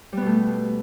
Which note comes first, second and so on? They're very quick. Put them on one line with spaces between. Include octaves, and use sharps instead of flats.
G3 B3 B2 A3